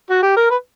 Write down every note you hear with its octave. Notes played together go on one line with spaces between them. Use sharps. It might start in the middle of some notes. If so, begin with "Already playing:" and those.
F#4
G4
A#4
B4